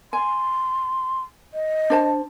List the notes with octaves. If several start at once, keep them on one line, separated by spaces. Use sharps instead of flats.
G#5 C6
D#5
D4 C5 A5